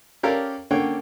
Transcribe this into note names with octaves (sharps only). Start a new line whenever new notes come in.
C#4 G4 A4 A#4 D5 F5
D3 A#3 C#4 C#5 F#5 G5